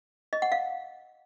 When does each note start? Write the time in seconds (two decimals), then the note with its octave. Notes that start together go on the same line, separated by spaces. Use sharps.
0.33 D#5
0.42 F#5
0.52 F5